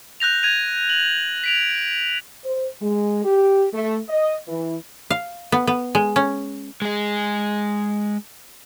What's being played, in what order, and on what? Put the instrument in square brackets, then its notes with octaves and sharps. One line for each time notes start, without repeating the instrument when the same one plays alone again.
[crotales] F#6 G6 A#6 F7
G#6 D#7 F7
F#7
B6 D7 F7
[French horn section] C5
G#3
G4
A3
D#5
E3
[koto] F5
B3
B3
G#3
C#4
[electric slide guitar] G#3 G#4